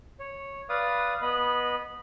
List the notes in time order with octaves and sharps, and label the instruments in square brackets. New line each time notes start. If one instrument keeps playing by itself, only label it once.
[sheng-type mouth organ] C#5
B4 D5 F5 D#6
B3 D#5 B5